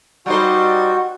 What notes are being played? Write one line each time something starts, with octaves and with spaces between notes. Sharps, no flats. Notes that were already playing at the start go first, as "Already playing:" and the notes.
G3 D#4 F#4 C5